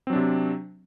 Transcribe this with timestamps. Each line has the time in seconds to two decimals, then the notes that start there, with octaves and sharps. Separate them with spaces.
0.07 C4
0.10 F#3
0.13 D4
0.16 C3